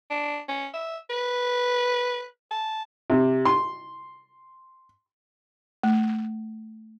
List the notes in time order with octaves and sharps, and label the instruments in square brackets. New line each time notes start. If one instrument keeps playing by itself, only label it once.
[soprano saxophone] D4
C#4
E5
B4
A5
[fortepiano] C3
C6
[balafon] A3